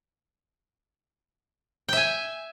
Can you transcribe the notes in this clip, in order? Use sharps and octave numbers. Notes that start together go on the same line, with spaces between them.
E5 G5 G#5